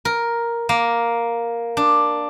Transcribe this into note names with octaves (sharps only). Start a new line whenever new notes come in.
A#4
A#3
D4